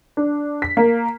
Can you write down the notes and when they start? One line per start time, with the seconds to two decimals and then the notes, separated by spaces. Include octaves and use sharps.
0.17 D4
0.62 B6
0.77 A#3